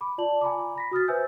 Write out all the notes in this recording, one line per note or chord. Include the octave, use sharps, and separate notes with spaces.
B5 D6
F4 D5 A5 F#7
G#5 A#5 B5 D6
B5 A#6 B6
F#4 D#6 F6 A6
B4 C5 E5 G#5 E6 G6